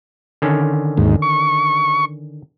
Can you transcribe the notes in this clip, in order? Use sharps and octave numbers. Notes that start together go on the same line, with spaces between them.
D3 D#3 C#4
D#2 G#2
C#6